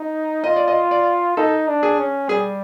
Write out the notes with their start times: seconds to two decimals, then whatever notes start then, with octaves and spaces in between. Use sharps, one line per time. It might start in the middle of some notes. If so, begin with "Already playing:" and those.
Already playing: D#4
0.44 F4 D#5
0.56 D5
0.68 D#5
0.91 D5
1.37 D#4 A4
1.67 D4
1.83 G#4
1.99 C#4
2.29 G3 G#4